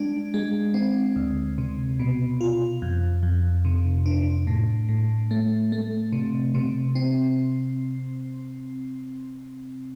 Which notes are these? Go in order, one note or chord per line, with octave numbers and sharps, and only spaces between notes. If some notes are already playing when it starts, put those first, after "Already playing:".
Already playing: G#3 D4
G#3
C4
D2
C3
B2
F4
F2
F2
C3
D4
A2
A2
A3
A3
C3
C3
C4